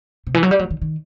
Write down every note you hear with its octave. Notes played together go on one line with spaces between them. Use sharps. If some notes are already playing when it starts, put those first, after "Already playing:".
C3
E3
F#3
G3
F#3
D#3
D#3